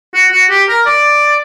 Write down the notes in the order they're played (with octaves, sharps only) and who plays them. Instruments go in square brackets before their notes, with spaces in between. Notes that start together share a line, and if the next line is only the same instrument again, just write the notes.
[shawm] F#4
F#4
G4
A#4
D5